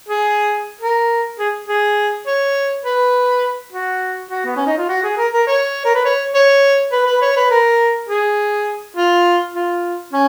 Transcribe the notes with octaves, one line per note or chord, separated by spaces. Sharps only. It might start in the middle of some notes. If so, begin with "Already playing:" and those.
G#4
A#4
G#4
G#4
C#5
B4
F#4
F#4
B3
C#4
D#4
F4
F#4
G#4
A#4
A#4
C#5
A#4
B4
C#5
C#5
B4
B4
C#5
B4
A#4
G#4
F4
F4
C#4